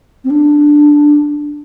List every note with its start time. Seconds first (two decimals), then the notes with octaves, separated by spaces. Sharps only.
0.24 C4
0.30 D4